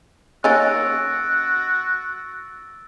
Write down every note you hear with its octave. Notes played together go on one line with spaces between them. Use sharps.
A#3 C#4 D#4 F#4 E6 A6 D7